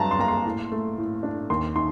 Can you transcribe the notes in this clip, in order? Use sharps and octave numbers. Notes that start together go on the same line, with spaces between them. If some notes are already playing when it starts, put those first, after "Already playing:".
Already playing: G2 F#3 D4 A5 A#5 C6
C6
A#3 A#5
C6
A2
A3
A2
D4
D#2 C6
D#3 C6